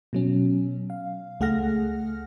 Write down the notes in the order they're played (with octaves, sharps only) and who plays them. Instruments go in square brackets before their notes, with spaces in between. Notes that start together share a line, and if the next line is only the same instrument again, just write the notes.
[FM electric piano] B2 F#3 C#4
F5
C#2 A3 G#4 F#5 F6 A#6